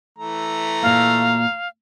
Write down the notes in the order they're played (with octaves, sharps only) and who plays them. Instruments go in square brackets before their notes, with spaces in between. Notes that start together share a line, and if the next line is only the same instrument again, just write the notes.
[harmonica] E3 A3 A#5
[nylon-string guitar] A#2 A#3 [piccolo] F5